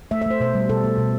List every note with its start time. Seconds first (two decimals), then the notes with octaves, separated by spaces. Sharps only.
0.11 A3 E5
0.22 E5
0.26 A3 C5
0.40 B2 C5
0.55 G3
0.69 B2 A4
0.84 A3
0.98 B2